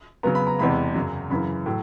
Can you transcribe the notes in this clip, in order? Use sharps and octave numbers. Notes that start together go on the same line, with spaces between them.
C#3 F#3 B3 A#5
B5
A#5
E2 C3 E3 G#3 B5
F#2 C#3 F#3
F#2 C#3 E3 B5
A2 F#3